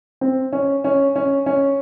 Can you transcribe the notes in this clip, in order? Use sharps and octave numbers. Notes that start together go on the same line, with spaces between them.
C4
C#4
C#4
C#4
C#4